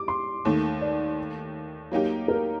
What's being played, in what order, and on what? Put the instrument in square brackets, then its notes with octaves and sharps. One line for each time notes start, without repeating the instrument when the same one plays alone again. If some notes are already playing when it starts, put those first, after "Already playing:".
Already playing: [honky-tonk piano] G3 [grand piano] D6
[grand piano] C6
[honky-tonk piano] D#2 D#3 A3
[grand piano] D5
[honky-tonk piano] F#3 A#3 D#4 G4
[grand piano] A#4